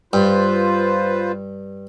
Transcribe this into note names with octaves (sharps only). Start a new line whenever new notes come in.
G2 F4 B4 C5